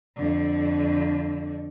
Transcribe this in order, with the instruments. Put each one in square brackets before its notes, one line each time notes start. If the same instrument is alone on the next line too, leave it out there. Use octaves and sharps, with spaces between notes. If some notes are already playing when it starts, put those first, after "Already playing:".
[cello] F2 D3